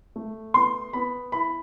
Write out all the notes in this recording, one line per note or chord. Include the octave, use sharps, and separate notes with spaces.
A3
B3 C6
B3 B5
E4 B5